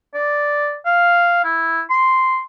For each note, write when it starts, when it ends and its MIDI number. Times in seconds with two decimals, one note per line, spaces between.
0.14 0.76 74
0.86 1.44 77
1.44 1.81 64
1.90 2.40 84